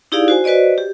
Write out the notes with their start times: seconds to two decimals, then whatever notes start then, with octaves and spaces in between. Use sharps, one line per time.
0.12 D#4 E4 G4 G#4 D5 F5
0.28 F#4 C5 G#5
0.44 F#4 B4 C5 D5 D#5
0.78 G4